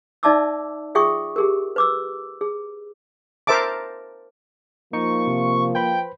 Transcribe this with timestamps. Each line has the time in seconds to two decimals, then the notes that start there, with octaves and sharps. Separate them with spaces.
0.23 D#4 D5 E5 A5 D6 E6
0.95 F4 G#4 E5 G5 C#6 D#6
1.36 G4 G#4 A#4
1.76 B4 D6 E6
2.41 G#4
3.47 A#4 C5 E5 A5 D6
4.93 F3 A#3 D#4 C#6
5.27 C3
5.75 B4 C5 G5 B5